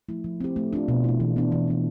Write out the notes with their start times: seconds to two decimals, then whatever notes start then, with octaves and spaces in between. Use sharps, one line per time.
0.09 F3 A3 E4
0.24 F3
0.41 C4 G4
0.56 A3
0.73 D4 F4
0.88 B2
1.04 A3 E4
1.20 E3
1.36 B3 D4
1.52 E3
1.68 B3 D4